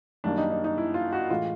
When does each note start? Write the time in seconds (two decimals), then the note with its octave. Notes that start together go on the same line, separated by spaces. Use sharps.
0.24 F#2 D#3 G3 A#3 D4
0.38 D#4
0.51 D#4
0.64 D#4
0.78 E4
0.94 F4
1.13 F#4
1.30 A2 E3 G#3 F4